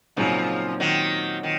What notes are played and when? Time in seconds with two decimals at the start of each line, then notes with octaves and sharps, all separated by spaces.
0.16 A#2 C#3 F3 F#3 C4 D#4
0.80 D#3 F#3
1.43 D#3